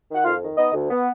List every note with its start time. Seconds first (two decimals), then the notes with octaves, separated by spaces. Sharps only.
0.09 D#3
0.15 F#5
0.25 F2 F4 F5
0.42 D#3
0.58 B3 D#4 D#5
0.74 D2
0.90 B3